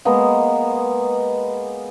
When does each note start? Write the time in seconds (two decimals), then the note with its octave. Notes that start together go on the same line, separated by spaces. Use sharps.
0.05 G#3 A#3 B3 D#5